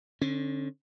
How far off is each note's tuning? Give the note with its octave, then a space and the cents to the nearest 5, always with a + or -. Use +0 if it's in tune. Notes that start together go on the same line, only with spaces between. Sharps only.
D3 +0 C#4 -40